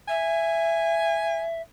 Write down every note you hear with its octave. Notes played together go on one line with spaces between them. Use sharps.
E5 G#5